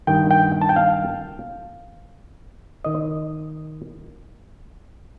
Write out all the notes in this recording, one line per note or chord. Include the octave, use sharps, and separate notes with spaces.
G2 D#3 G5
G5
A5
G5
F5
D#3 D#5